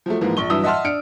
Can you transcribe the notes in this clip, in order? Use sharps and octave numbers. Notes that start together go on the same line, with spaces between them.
F3 F#3 A3
G#2 E3 F3 A#3
A#1 C#6 G7
G2 E3 F#3 E4 D#6 E6
D#5 E5 F#5 A5 C6 F6
D4 F6 C#7 D7